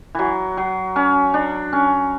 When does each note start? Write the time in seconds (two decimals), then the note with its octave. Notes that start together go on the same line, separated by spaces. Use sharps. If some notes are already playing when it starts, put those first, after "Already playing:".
0.15 E3 F#3
0.57 F#3
0.96 C#4
1.34 D4
1.73 C#4